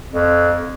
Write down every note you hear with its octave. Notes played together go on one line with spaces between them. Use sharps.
F2